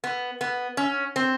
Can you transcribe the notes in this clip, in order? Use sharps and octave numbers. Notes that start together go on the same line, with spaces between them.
B3
B3
C#4
C4